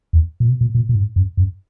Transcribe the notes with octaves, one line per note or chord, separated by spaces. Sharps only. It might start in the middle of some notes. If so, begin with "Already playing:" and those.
E2
A#2
B2
A#2
A#2
A#2
G#2
F#2
F#2